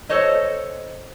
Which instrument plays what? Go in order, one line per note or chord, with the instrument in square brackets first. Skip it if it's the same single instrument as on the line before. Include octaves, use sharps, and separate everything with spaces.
[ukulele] A4 C5 C#5 D#5